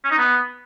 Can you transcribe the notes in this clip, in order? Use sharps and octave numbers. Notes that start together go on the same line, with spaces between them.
C#4
D#4
B3